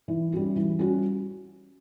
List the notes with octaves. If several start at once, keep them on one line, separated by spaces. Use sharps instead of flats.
E3
G3 C#4 F#4
E3
G3 C#4 F#4